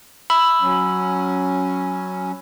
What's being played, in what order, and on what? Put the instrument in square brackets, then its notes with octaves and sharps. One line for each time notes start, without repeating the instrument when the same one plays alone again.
[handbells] B5 E6
[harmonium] F#3 C#4